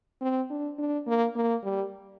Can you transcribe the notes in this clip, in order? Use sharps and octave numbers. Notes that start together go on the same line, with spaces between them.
C4
D4
D4
A#3
A#3
G3